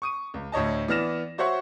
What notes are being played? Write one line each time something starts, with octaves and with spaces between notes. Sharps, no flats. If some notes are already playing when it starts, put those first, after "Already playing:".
C#6 D#6 D#7
C#2
D2 A2 C#5 D#5 A5
E3 B3 D5 F6 A#6 E7
F#4 C5 C#5 E5 F#5 C#6